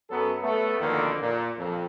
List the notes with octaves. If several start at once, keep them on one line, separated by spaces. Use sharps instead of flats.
F#2 F#3 B3 A4
A3 B3
B1 F2 D3 D#3 A#3
A#2
F2